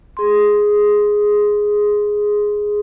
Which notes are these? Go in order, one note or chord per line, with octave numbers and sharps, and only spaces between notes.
G#4 C6